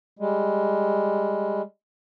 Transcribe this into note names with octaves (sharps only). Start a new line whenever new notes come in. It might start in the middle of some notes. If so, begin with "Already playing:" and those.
G3 G#3